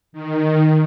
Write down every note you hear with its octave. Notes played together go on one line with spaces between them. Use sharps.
D#3